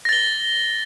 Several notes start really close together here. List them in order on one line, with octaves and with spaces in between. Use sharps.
A#6 A6 G7